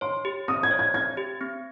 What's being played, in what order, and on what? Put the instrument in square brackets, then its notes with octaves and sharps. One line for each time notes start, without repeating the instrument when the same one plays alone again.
[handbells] C#5 [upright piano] C6
[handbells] G4
[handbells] C4 [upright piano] D#6
[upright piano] G#6
[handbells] C#5
[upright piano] G#6
[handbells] C4 [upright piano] G#6
[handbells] G4
C4